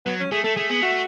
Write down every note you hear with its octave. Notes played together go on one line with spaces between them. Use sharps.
F#3 B3
C#4
A3 G#4
A3 A4
A3 G#4
B3 G#4
A3 F#4